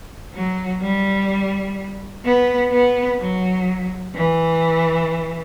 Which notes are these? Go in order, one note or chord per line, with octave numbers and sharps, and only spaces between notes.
F#3
G3
B3
B3
F#3
E3